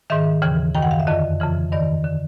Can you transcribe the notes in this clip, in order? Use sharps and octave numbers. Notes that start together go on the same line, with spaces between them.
G#2 D#3 E5
D#2 C#3 E3
F#2 D#3 G5
F#5
F5
E5
F2 D3 D#5
F2 C#3 E3
G2 D#3 D5
D3